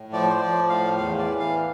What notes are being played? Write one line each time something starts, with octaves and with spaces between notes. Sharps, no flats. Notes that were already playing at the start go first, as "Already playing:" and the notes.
Already playing: A2
F3 D5
C5
F3 D5
A2 F5
E2 F5
D5
E3
F5